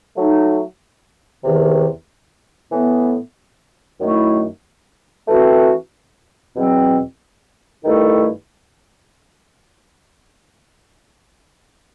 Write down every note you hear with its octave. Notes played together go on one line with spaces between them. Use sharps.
F#3 A3 D#4
E2 C3 D#3
A2 E3 B3
F#2 D#3 A3 E4
E3 A3 C4 F#4
E2 B2 F#3 C4
G2 D#3 A3 E4 A4